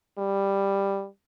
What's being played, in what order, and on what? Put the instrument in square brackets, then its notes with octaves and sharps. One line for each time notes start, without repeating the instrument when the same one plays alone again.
[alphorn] G3